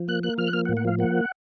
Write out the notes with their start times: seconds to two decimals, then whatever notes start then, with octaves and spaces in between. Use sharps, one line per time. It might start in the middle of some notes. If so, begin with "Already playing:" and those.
Already playing: F3
0.08 A#3 F#6
0.23 A#3 F#6
0.38 F3 F6
0.47 F#6
0.53 A#3 F6
0.65 F#5
0.69 A2
0.77 F#5
0.85 F3 F5
0.99 A#3 F#5